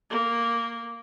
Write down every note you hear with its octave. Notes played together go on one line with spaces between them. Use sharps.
A#3